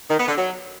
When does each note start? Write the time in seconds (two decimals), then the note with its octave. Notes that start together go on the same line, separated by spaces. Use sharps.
0.10 D#3
0.19 B3
0.28 D3
0.37 F#3